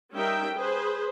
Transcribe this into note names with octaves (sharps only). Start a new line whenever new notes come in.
G3 C#4 D#4 A#4 E5 G5
G#4 B4 C5